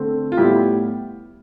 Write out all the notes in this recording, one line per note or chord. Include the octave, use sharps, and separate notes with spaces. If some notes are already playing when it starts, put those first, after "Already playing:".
Already playing: D3 A3 C4
F4
A2 G3 B3 E4 G4